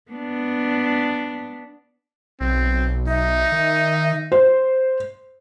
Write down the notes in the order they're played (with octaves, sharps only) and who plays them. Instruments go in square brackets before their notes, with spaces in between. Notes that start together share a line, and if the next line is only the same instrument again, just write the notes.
[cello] B3 D4
[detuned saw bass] B1 [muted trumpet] C4
[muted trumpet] D#4 [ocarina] E5
[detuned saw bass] D#3
[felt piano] C5